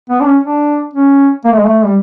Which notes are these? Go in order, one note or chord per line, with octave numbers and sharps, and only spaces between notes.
B3
D4
C#4
D4
C#4
A#3
A3
G#3
A3
G3